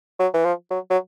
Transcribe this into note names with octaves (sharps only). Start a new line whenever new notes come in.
F#3
E3
F3
F#3
F#3